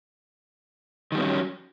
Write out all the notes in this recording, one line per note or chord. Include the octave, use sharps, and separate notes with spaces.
D#3 F#3 G3 B3 C#4